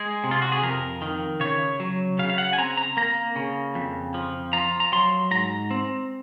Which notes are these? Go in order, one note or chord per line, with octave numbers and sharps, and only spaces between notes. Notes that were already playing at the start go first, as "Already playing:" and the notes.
Already playing: G#3 G#4
C3
F4
F#4
G#4
F2 A#4
D#3
C#3 C#5
F#3
C#3 F5
F5
F#5
G#5
C4 A#5
A#5
A#3 A#5
C#3
F2
F3
F4 A#5
A#5
F#3 C6
G#2 A#5
C4